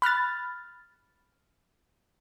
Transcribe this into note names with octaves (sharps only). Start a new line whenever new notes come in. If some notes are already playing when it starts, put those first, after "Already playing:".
B5 F6 F#6 A6